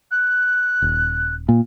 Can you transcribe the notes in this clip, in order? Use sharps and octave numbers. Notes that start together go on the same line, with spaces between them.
F#6
D#1
A#2